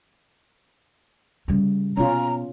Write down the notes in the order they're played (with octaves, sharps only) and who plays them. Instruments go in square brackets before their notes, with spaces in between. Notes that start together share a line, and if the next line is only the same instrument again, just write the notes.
[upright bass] C#3 G3
[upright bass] B2 [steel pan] C#4 F4 [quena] A#5